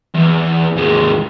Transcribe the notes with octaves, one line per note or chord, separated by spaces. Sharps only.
E2
D#2 G#3